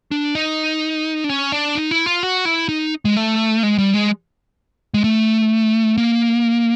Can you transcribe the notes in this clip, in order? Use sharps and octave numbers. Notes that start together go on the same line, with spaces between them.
D4
D#4
D4
C#4
D4
D#4
E4
F4
F#4
E4
D#4
G#3
A3
G#3
G3
G#3
G#3
A3
A#3